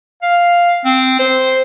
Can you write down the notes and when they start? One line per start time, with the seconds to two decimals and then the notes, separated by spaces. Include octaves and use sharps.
0.23 F5
0.85 C4
1.19 C5